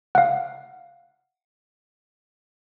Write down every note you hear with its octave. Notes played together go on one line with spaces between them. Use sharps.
F5 F#5